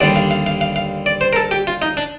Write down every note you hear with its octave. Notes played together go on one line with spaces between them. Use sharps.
D#2 D3 G3 D5
F5
F5
F5
F5
F5
D5
C5
A#4
A4
G4
F4
D#4
D4